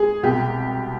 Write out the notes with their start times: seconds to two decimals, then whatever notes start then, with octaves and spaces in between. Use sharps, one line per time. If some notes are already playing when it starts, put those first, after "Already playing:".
Already playing: G#3 G#4
0.23 C2 B2 G#3 G4